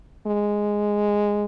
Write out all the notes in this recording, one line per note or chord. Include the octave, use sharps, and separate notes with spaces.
G#3